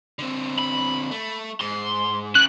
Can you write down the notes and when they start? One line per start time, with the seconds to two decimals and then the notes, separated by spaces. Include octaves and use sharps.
0.19 D3 C4
0.59 B5
1.11 A3
1.61 G#2 C6
2.35 C#4 G4 F#6